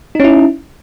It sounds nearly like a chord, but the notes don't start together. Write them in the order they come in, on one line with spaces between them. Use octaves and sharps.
D#4 C#4 E4